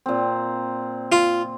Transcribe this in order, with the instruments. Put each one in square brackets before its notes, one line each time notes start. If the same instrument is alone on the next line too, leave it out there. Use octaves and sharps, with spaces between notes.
[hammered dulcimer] A#2 C4
[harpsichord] F4